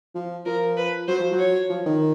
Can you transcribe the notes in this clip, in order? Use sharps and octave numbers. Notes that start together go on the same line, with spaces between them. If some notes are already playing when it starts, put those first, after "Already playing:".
F3
F3 A#4
B4
F#3 C5
F3
F#3
C#5
F3
D#3